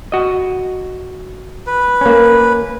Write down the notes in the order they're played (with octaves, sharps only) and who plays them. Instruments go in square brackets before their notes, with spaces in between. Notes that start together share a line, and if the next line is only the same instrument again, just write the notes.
[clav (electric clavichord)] F#4 D#5
[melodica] B4
[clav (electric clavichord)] A#3 C#4